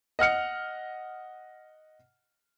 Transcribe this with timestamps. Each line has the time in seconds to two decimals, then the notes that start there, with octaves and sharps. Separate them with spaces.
0.19 D#5 F#5 F6 C#7